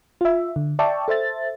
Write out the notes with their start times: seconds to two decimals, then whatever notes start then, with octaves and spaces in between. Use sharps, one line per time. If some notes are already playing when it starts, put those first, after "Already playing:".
0.21 F4 E5
0.56 D3
0.79 D5 E5 G5 A5 C#6
1.08 A4 C5 E5 A6